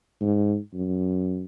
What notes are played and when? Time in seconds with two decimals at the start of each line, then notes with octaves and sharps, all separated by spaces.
0.21 G#2
0.74 F#2